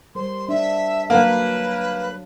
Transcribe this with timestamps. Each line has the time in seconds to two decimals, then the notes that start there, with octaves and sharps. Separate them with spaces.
0.15 G3 A#4 C5 C6
0.49 D4 E5
1.10 D3 F#3 A#3 B4 F5